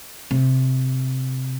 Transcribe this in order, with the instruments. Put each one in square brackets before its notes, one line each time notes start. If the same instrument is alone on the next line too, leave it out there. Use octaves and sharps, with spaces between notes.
[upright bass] C3